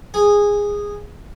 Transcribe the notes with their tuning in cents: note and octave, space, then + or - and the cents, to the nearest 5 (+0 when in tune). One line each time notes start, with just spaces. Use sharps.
G#4 -15